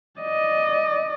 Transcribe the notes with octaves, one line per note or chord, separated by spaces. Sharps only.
D5 D#5